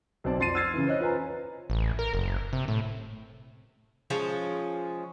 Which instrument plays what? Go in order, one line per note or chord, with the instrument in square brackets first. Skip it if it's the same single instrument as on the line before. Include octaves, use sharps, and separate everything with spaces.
[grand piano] B1 C4 C5 D5 A5
F2 F3 C6 A6 C7 D#7
E6 F6 G#6 A6 C7
C#3 E3
C5 C#5 D#5 F#6
F4 B4 C5 G#5 A#5
[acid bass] A1
A#4
F#1
C3
A2
[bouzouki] F3 G#3 C#4